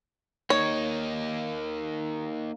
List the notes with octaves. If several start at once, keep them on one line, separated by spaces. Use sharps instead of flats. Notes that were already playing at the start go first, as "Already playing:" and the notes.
A#3 D#4 C#5